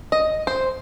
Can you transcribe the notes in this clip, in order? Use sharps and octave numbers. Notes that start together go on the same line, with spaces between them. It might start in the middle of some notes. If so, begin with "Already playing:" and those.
D#5
C5